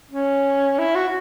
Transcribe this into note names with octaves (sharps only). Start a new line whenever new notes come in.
C#4
E4
F#4